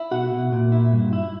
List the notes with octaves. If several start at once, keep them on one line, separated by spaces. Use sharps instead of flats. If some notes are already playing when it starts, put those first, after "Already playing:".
Already playing: E4
B2 F#4 F#5
B2
A#2
E4
G2
E4